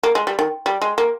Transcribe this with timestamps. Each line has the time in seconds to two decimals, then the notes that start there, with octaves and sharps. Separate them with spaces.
0.03 A#3
0.15 G#3
0.27 G3
0.39 D#3
0.66 G3
0.82 G#3
0.98 A#3